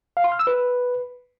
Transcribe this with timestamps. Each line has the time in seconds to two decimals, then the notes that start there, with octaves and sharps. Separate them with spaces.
0.17 F5
0.24 C6
0.32 F6
0.39 E6
0.47 B4